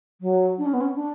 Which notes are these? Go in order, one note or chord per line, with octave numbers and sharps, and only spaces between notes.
F#3
D4
C#4
B3
C#4
D4